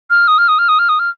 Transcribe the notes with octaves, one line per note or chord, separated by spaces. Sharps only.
F6
D#6
F6
D#6
F6
D#6
F6
D#6
F6